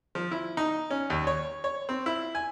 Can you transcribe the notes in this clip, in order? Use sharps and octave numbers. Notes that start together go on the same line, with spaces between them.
F3
E4
D#4
C#4
D#2
C#5
C#5
C4
E4
G#5